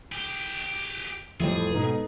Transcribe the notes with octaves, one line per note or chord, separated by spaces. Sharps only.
G4 G#4
F2 A2 E3 F3 G3 G#4
G#2 B2 D#4 A4 B4